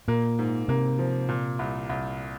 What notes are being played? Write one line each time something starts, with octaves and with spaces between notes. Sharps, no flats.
A#2 A#3
G#2
C3 A#3
F3
A#2
C2
C2